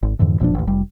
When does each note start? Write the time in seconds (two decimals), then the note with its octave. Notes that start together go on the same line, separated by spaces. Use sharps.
0.03 G#1
0.19 F2 G#2 D3 E3
0.40 E1 A#2 F3 D4
0.55 A1 D#2
0.67 F1 G3